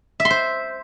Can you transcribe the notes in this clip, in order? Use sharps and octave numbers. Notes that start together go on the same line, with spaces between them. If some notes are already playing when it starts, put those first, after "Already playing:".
E5
C6
C5